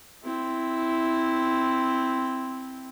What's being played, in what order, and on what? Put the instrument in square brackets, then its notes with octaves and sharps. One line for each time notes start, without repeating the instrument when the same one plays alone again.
[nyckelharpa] C4 E4